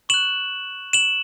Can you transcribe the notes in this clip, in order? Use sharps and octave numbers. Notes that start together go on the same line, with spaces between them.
C#6 F#6 E7 F#7
E7 F#7